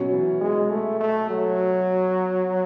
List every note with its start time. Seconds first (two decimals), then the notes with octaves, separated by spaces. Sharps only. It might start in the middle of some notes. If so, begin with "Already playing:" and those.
Already playing: B2 F#3 C#4
0.11 E3
0.41 G#3
0.71 A3
1.01 A3
1.30 F#3